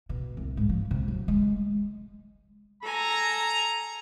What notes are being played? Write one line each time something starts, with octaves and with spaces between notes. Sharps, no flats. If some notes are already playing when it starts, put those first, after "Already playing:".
B2
C2
G#2
F3
C3
F#3
G#3
A4 G#5 A#5